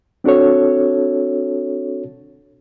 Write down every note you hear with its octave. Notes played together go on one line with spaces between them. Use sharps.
C4 D4 F#4 A4 C#5